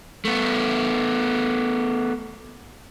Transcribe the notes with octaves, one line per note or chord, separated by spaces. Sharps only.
A3 B3